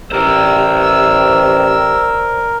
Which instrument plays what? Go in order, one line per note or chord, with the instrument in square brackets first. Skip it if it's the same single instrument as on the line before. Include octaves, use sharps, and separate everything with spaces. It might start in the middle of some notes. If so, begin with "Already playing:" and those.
[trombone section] A1 G4 [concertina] A#4 [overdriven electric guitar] C5 D5 [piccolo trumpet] E6